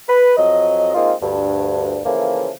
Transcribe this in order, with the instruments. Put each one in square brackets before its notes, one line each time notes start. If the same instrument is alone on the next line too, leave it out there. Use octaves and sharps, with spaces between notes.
[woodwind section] B4
F2 F#3 D#5
G#3 A#3 C4 D#4 F4
D2 G2
C#3 E3 F3 A3 A#3